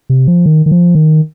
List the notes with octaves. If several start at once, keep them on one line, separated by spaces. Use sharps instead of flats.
C3
F3
D#3
D#3
F3
D#3